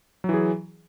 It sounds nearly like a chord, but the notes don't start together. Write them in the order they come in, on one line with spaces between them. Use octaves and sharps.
F#3 E3 G#4